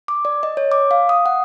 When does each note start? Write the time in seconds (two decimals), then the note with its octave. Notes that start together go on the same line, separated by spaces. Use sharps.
0.08 D6
0.25 D5
0.43 D#5
0.57 C#5
0.72 D6
0.91 F5
1.09 D#6
1.26 F#5